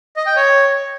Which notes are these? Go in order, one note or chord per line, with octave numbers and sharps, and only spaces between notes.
D#5
G5
C#5